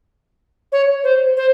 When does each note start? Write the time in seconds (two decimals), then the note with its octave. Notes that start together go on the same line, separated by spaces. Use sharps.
0.72 C#5
1.04 C5
1.37 C5